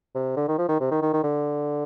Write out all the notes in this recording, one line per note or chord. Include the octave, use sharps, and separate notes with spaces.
C3
D3
D#3
F3
D#3
C3
D#3
D#3
D#3
D3